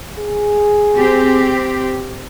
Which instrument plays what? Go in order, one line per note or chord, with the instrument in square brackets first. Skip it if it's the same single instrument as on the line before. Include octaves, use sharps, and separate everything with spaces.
[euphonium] G#4
[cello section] C4 G4